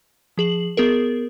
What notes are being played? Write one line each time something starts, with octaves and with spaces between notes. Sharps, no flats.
F3 G#4 F#7
B3 G#4 A#4